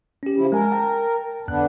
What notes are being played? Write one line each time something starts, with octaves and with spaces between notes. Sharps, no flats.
C#4 G4
C#3 F3 E4
G#3 A#4 G#5
G5 A5
F2 D3 B3 D4 F#6